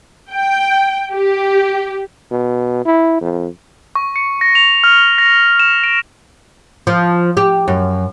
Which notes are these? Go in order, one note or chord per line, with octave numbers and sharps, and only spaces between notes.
G5
G4
B2
E4
F2
C#6
C#7
A#6
F7
F6
A#6
E7
D7
F3
G4
F#2